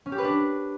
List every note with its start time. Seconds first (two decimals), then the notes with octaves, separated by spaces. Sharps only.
0.06 C#4
0.12 G4
0.18 B4
0.24 D4